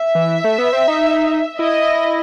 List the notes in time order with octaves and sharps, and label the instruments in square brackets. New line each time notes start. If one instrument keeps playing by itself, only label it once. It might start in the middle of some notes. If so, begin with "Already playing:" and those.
Already playing: [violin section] E5
[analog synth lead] E3
A3
B3
C4
D#4
[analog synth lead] E4 [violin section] D#5